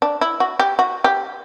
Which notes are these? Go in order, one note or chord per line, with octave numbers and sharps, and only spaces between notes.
D4
E4
F#4
G4
F#4
G4